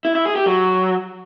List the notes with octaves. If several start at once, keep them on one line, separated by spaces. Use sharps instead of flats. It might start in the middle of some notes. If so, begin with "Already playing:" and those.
E4
E4
G#4
G4
F#3